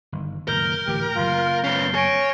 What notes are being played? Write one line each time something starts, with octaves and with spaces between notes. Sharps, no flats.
G1 D#3
F#1 A#2 D#3 A#4 F6 G6 G7
D2 A2 E3 G4
F#1 F#2 F4
B3 C#4 C7 G7
C#5 G#5 C#6 A#6 D7